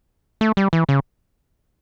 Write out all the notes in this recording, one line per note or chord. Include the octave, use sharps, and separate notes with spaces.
A3
G3
E3
C#3